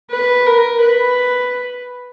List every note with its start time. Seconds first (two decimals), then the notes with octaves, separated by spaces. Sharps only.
0.11 B4
0.47 A#4
0.82 B4